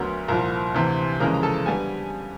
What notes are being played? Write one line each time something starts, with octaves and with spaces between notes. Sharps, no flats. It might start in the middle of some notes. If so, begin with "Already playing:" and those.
Already playing: D2 D3 F#3 B3 A#4 A#5
C2 A#2 F3 A#4 A#5
D2 C3 E3
F2 C#3 E3 G#3 A#4 A#5
A#5
A4 A5
D3 G3 B3 G#5